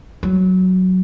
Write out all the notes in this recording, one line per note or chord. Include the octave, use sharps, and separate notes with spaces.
F#3